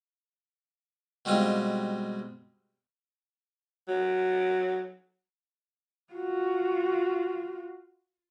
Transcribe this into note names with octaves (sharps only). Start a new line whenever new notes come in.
B2 G3 G#3 C4 F4
F#3
F4 F#4